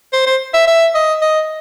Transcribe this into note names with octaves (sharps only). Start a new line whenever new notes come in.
C5
C5
E5
E5
D#5
D#5